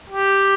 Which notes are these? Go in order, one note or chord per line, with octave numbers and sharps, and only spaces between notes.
G4